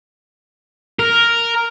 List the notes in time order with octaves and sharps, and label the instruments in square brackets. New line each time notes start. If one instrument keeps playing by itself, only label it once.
[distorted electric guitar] A#4